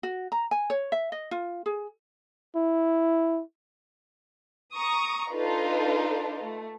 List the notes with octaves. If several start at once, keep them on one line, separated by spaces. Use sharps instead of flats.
F#4
A#5
G#5
C#5
E5
D#5
F4
G#4
E4
A#5 C#6 D#6
D4 D#4 F4 A4 B4
A3